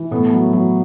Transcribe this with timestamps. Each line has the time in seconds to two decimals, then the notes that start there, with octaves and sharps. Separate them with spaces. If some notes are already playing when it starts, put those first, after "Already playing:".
Already playing: E3
0.11 A2 B3
0.33 F#3
0.53 F#3